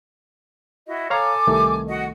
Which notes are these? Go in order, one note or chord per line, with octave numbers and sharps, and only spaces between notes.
E4 F#4 D#5
A4 C#5 F5 G#5 A#5 D6
C2 D#3 A3
F#4 D#5 F#5